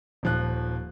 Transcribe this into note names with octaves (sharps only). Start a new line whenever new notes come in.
D#1 F3 F#6